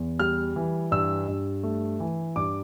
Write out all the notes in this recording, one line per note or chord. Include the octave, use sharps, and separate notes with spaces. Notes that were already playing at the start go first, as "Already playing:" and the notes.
Already playing: E2
G3 F6
E3
G2 E6
G2
A3
E3
G2 D6